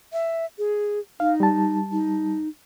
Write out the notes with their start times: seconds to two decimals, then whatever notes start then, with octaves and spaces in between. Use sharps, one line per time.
0.13 E5
0.58 G#4
1.20 D#4 F5
1.40 G3 A5
1.92 D#4